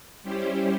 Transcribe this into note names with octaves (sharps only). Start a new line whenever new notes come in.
G3 C#4 E4 G4 C5